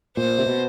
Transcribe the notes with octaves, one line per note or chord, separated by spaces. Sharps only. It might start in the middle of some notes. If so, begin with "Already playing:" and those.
A#2 C5
C3
B2